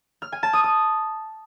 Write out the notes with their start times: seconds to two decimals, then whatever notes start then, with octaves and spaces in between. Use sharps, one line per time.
0.22 F6
0.32 G#5
0.43 A5
0.53 D#6
0.64 D#6